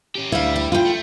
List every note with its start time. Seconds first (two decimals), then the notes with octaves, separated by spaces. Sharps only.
0.15 C#4 G4
0.32 D2 G3 E4 F5
0.56 E4
0.72 D3 E4 F4 G5
0.85 A3